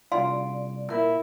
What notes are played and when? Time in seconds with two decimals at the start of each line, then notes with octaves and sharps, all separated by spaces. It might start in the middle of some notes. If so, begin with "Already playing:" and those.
0.12 C2 G2 F4 D5 F5 C6
0.90 A#2 E4 A#4